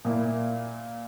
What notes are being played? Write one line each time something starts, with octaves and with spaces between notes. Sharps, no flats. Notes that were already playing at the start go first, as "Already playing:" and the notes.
A#2 A#3 E4